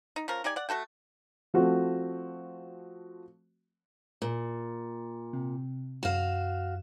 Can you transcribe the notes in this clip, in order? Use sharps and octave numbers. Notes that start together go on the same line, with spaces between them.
D#4
F3 C#4 A#4
D#4 G4 D5 G#5
D5 F#5
A3 F#4 A4 G5
F3 A3 C4 F#4
A#2
C3
F#2 F#4 F5 E7